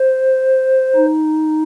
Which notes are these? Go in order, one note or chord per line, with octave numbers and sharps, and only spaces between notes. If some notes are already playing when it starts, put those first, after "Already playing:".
Already playing: C5
D#4